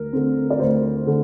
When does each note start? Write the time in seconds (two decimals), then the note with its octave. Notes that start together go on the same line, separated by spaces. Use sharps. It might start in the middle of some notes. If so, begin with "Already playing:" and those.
Already playing: D2 A#4
0.13 D3 A3 C4
0.50 D5
0.60 D2 C5
1.07 D3 A3